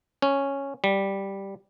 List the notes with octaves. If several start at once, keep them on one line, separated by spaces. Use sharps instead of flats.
C#4
G3